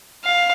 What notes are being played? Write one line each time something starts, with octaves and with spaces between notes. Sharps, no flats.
F5